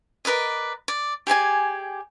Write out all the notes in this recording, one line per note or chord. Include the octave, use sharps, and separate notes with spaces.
A#4 B4 D5 D#5
D5
G4 G#4 D5 G#5